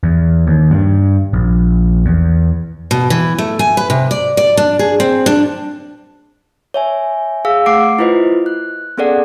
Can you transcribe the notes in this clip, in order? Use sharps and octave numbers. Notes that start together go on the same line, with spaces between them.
E2
D#2
G2
A#1
E2
B2
E3
A3
G#5
B4
C3
D5
D5
D4
G#4
C4
D4
C#5 E5 G#5
G#4 F5 E6
A3 F#5 D6 C7 D7
E4 F4 B4 C5 D#5
F#6
B3 C#4 G#4 A4 D5 F#5